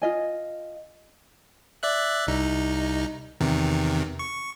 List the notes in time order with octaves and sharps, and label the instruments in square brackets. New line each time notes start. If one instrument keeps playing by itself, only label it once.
[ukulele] F4 D#5 G#5
[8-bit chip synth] D5 E5 F#6
C2 D#4
E2 C3 D#3
C#6